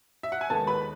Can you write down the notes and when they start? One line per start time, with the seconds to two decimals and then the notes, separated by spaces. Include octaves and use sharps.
0.23 E5
0.32 F#5
0.41 G#5
0.49 D#2 D#3 G#3 B3 A4 A5
0.67 B4 B5